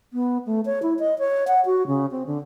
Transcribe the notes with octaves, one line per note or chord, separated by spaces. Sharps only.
B3
A3
C#5
E4
D#5
C#5
F#5
F#4
C#3
C4
D3